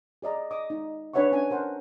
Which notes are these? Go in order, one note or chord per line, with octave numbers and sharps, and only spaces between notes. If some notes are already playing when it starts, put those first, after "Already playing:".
G#4 D5 D#5 A#5
D#5 D6 D#6
D#4
D4 B4 C#5 E5 F#5 C#6
C#4 D4 G#5
A#4 C5 F#5 G5 A5